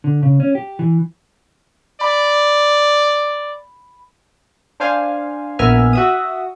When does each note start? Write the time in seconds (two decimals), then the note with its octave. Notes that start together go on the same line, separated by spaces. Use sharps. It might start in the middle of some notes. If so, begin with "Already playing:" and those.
0.04 D3
0.23 C#3
0.40 C#4
0.55 G4
0.79 E3
2.01 D5 B5
4.80 D4 C5 F5 G#5
5.59 A#1 B3 A#4 E5 G#5 F6
5.93 F#4 E5 D#6